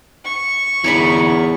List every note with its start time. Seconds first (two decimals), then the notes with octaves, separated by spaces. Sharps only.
0.25 C#6
0.84 E2 D3 D#4 E4 C#5 D5 B5